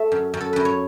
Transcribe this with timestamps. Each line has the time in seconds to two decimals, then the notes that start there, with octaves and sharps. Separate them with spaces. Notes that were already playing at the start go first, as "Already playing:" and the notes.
Already playing: A3 E5
0.12 F#2
0.34 F#2
0.41 A4
0.53 F#2 B4
0.65 C#5